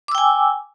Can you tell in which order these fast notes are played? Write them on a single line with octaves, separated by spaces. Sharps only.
D6 E6 G5 G#5